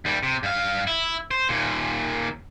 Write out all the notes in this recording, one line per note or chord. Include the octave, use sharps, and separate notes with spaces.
D#2 G3
C3
G2 F5
E4
C5
D#2 A#2